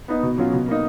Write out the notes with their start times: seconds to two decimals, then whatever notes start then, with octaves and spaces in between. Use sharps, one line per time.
0.08 B3 D#4
0.23 B2
0.38 F#3 C#4 F4
0.53 B2
0.68 A#3 D#4